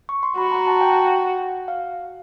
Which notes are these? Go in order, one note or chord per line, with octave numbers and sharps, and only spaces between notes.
C#6
C6
F#4 B5
A#5
A5
G5
F5